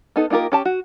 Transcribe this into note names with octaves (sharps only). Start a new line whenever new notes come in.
B3 D#4 A4
A#3 D#4 F4 G4 A#4
C#4 G4 A5
F#4